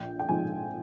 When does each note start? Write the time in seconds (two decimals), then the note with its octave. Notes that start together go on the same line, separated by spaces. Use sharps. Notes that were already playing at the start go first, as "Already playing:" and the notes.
Already playing: A#1 G5
0.19 G5
0.29 G#2 F3 G#3 G#5